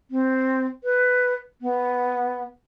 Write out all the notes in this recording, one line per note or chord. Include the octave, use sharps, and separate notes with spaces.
C4
B4
B3